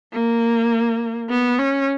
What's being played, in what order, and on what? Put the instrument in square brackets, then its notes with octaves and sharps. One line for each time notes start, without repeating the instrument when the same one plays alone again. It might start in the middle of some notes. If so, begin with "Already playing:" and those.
[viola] A#3
B3
C#4